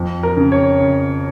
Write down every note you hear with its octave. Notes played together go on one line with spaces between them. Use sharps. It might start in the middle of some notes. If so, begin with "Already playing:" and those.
Already playing: F2
A#4
C#3
C#5
C#3